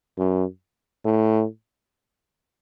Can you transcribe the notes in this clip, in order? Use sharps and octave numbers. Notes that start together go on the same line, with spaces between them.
F#2
A2